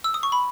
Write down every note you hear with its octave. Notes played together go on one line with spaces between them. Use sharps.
E6
D#6
C#6
B5